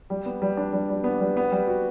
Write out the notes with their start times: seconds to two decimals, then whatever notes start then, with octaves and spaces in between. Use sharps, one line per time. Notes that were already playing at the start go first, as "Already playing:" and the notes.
0.10 G3
0.26 B3
0.42 G3
0.57 D4
0.73 G3
0.89 G3
1.04 B3
1.20 G3
1.37 B3
1.52 G3
1.67 F#4